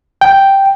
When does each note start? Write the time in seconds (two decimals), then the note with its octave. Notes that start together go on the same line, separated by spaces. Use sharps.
0.21 G5